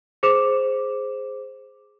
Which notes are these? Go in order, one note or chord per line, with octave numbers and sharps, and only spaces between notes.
G#4 C5 D6 E7